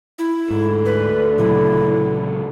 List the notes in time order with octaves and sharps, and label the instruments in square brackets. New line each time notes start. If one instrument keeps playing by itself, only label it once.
[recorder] E4
[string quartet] D2 D3 [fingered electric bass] G#2
[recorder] B4
[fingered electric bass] A#2 C#3 F#3 [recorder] E4